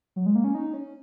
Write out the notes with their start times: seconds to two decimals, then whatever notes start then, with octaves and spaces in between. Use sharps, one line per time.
0.16 F#3
0.26 G#3
0.35 A#3
0.44 C#4
0.55 D#4
0.73 C#4